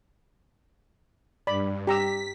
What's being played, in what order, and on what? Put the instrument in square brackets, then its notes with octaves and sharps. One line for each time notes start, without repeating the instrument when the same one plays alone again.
[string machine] G2 [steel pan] D5 B5
[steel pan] G4 A#5 E6 [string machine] B6